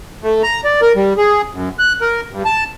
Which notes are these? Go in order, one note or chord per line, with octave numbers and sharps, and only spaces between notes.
A3
A#5
D5
A#4
G3
G#4
F#2
F#6
A#4
G2
A5